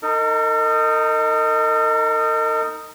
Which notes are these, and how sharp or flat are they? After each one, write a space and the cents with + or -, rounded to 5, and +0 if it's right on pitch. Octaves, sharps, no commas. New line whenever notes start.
D#4 +0 A#4 -45